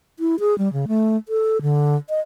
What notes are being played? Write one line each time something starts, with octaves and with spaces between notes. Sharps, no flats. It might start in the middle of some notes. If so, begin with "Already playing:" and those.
E4
G#4
G3
C#3
A3
A4
D3
D#5